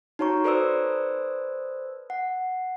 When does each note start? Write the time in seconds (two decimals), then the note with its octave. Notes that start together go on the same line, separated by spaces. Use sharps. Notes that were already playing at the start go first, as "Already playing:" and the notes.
0.19 D#4 F#4 C#5 A#5 C#6
0.44 A4 B4 C5 D5 D#6 E6
2.10 F#5